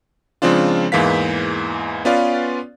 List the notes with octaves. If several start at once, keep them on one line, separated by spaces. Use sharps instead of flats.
C#3 F3 G#3 C4 D4 F4
E2 G#2 E3 A#3 F5 B6
B3 C#4 F4 B4 D5 F5